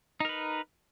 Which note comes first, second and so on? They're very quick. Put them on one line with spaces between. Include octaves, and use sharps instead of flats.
D#4 A#4 B4